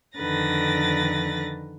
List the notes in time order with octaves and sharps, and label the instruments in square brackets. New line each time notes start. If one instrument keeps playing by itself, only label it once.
[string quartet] F2 D3 D#3 B4 A6 A#6